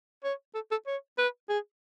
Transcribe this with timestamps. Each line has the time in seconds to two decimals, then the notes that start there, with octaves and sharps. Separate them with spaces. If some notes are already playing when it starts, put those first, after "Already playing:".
0.24 C#5
0.55 A4
0.71 A4
0.87 C#5
1.18 B4
1.49 G#4